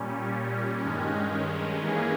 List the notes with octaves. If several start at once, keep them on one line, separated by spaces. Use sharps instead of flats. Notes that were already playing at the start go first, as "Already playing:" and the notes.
Already playing: A#2 G3 C#4
G2 D#3 G#3 C#4
E3 A#3 C#4 G#4